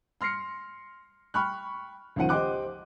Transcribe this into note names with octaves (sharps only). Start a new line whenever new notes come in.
C6 F6 A#6 C7 C#7
G5 B5 C#6 F6 F#6
C#2 D#3 F3 F#5 D#7
G4 C5 D#5 G5 D6 F#6